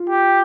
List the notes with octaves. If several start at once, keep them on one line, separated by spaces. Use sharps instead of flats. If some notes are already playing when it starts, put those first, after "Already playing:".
Already playing: F4
G4